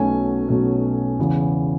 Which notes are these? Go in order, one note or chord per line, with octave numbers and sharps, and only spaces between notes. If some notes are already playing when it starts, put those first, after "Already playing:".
Already playing: B1 B2 A3 C#4 G#5
B1 B2 A3 C#4
E1 E2 C#3